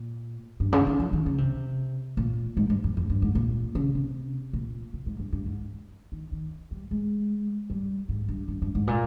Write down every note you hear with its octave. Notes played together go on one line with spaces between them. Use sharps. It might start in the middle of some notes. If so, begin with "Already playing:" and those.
Already playing: A#2
G2
C#3
D#3
F3
D#3
C#3
C3
A#2
G#2
G2
F2
F2
G2
G#2
A#2
C#3
C3
A#2
C3
G#2
G2
G2
G#2
D#3
D#3
G3
G#3
G3
G#2
G2
G2
G2
G#2
A#2